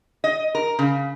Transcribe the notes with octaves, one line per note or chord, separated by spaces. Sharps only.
D#5
A#4
C#3